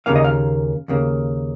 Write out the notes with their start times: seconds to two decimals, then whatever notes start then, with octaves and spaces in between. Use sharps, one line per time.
0.06 D#2 C#3 A#3 F5
0.16 D#5
0.24 F5
0.88 D#2 C#3 A#3